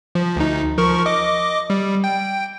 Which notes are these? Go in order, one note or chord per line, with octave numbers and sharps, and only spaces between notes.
F3
D2 D#4
F3 A#4 C#6
D#5 D6
G3
G5